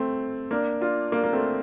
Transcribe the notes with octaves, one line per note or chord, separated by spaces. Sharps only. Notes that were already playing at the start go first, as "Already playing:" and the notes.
Already playing: A3 C4
A#3 D4
D4 F4
A#3 D4
A#3
A3 C4